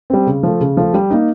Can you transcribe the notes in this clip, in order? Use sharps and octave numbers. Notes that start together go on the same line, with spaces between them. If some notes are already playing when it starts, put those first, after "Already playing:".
G3 C4
C#3
F3 A3
C#3
F3 A3
G3
A#3 D#4